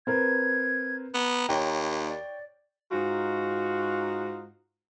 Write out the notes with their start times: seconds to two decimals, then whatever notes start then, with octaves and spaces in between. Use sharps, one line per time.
0.07 C4 A#4 B4 G#6
1.14 B3 A#5
1.49 D#2 C#5 G5
2.07 D5
2.92 G#2 D#4 F4 F#4